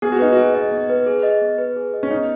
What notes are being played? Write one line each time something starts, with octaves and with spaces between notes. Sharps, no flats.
B3 G#4
F#4
D#4 B4
F#4 G#4
D#5
B3
B4
G#4
D#5
B3
B4
G#4
D#5
C#4
B3 D#4